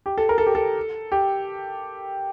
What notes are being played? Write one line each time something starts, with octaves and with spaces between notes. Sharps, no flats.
G4
A4
A#4
A4
G4
A4
G4